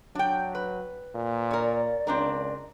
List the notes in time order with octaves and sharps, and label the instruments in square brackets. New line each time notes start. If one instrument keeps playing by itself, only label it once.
[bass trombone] F#3 [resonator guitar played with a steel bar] D4 G5
[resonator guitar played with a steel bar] B4
[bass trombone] A#2
[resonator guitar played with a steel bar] A#4 C#5 [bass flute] D5
[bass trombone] C#2 [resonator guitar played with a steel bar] C4 D4 A#4